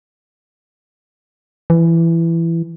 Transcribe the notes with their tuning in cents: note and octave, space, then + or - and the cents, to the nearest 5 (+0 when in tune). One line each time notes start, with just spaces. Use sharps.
E3 +15